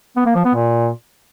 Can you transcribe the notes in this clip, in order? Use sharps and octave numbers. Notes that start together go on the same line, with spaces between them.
B3
A#3
F3
B3
A#2